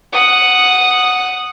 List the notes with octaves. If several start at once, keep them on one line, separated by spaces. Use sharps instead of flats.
F#5 D#6